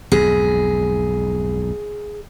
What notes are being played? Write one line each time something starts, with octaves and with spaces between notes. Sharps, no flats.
B1 F2 G#2 G#4